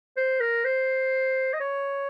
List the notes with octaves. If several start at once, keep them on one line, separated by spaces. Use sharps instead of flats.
C5
A#4
C5
D#5
C#5